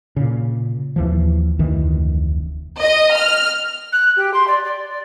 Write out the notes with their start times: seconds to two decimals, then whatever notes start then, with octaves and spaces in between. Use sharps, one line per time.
0.16 A#2 C#3
0.96 D#2 E3 F3
1.59 F1 D2 D#3 E3
2.81 D#5
3.15 F6
3.92 F#6
4.16 G4
4.33 C6
4.47 D5
4.64 D5
4.89 D5